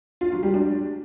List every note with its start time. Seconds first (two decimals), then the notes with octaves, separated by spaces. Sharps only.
0.21 F4
0.32 F#3
0.43 G3
0.54 D4